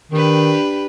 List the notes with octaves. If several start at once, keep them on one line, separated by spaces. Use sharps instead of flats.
D#3 D4 G4 B4